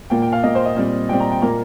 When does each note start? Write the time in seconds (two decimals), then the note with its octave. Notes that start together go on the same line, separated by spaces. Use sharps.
0.10 A#2 A#3 G5
0.22 G5
0.32 F5
0.43 A#2 A#3 D#5
0.55 C5
0.66 D#5
0.76 A#2 G3 C4
1.09 A#2 G3 C4 G5
1.20 A#5
1.31 G5
1.42 A#2 A#3 A#5